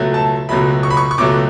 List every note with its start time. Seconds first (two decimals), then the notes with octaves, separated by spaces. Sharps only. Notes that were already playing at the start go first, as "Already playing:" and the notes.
Already playing: C#2 B2 F#3 A3
0.14 A5
0.49 C#2 B2 F#3 A3 B5
0.83 C#6
0.90 B5
0.97 C#6
1.11 C#6
1.18 C#2 B2 F#3 A3 D6